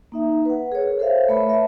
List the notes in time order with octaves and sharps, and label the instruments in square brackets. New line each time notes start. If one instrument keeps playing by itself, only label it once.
[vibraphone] A#3 D#4 E5
B4 F#5
G#4 A#4 C#5
A4 C5 C#5 E5 F5
A3 B4 C#5 E5 B5
E5 A5